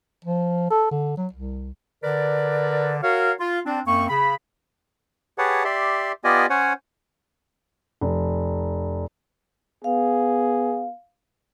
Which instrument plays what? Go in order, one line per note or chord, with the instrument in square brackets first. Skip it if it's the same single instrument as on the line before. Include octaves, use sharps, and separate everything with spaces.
[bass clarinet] F3
A4
D3
F#3
C2
[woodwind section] D3 A#4 B4 D5
F#4 A#4 C#5 F5
F4
C4 D4
F#2 A#3 C4 C#6
C#3 B5
[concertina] G4 G#4 B4 C#5 F#5 A5
G4 D5 E5 C6
B3 F4 G4 D5 D#5 G#5
C#4 C5 C#5 F#5 G#5
[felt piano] F1
[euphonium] B3 [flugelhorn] G#4 [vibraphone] F5